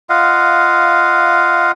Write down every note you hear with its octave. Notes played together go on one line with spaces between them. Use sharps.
F4 D#5 F5 F#5